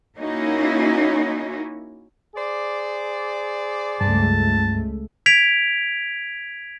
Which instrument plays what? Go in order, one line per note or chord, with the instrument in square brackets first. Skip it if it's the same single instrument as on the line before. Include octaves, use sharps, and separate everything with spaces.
[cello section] A#3 C#4 D#4 E4 F#4
[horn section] G#4 C5 D5
[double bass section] C#2 A3 [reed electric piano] G2 [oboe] A5
[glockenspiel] G#6 B6 D7 F7